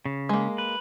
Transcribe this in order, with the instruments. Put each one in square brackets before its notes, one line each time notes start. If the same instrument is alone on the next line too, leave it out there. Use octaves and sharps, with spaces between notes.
[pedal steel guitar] C#3
[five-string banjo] G#3 A#3
[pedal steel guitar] B4